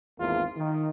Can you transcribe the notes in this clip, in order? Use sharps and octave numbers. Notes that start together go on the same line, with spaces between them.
G#1 E2 A#3 F4
D#3